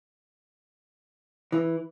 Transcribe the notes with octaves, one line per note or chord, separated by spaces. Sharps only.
E3